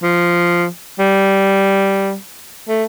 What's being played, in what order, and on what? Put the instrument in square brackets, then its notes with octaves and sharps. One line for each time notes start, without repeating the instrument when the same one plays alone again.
[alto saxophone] F3
G3
A3